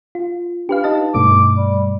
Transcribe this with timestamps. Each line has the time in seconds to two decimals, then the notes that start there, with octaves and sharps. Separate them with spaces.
0.15 F4
0.69 D4 G4 B4 F5
0.84 D#4 D#5 A5
1.14 G2 B2 A3 D6
1.56 G3